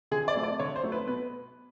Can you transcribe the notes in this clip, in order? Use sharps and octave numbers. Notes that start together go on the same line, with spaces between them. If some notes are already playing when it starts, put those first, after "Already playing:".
D3 G#4
D5
F#3 A3 C4
D5
D3 C#5
C5
F#3 A3 C4
B4
B2 B4